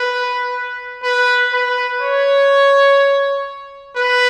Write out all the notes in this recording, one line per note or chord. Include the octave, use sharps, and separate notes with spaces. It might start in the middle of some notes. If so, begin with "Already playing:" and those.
Already playing: B4
B4
B4
C#5
B4